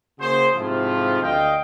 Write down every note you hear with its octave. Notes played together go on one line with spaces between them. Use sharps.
C#3 A#3 F#4 G#4 C5
G#2 C3 F3 A3 E4 F4
D2 D#5 F5 G5